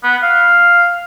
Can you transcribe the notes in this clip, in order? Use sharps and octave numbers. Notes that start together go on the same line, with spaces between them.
B3
F5